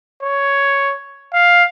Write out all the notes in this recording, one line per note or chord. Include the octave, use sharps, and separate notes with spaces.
C#5
F5